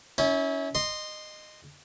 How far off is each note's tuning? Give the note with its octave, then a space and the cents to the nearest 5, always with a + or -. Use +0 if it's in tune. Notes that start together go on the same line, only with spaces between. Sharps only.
C#4 +15 E4 -30
D#5 -20 C6 +0